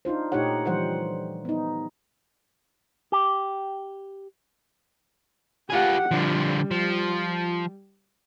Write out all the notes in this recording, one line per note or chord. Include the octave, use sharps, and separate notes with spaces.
D4 D#4 F4 C5
A#2 A3 D#4 G4 C#5 F#5
D3 E3 F3 G3 C5 F#5
B3 D#4
G4
F4 G4 G#4 F#5
D3 F3 G3
F3